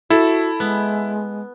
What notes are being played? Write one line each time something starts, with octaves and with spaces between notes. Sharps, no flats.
E4 F#4 A4
G#3 B3